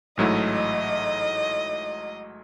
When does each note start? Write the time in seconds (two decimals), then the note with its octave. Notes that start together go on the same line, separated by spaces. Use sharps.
0.17 A1 G#2 F#3 A3 E4 D#5
0.53 D#5